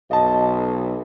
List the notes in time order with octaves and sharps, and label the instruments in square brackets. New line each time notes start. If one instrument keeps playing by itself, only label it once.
[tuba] B1 [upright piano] D#5 A5